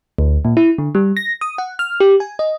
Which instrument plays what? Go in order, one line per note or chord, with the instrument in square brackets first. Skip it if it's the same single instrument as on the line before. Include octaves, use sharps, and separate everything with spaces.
[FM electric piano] D2
A#2
E4
D3
G3
A#6
D#6
F#5
F6
G4
G#5
D#5